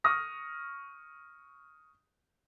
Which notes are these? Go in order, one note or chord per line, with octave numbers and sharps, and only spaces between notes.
C#6 D#6 F6 A#6